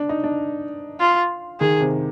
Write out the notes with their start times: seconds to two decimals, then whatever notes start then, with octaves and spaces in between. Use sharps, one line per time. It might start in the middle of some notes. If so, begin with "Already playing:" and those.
Already playing: D4
0.09 D#4
0.24 D4
1.00 F4
1.60 D#3 G#4
1.81 C3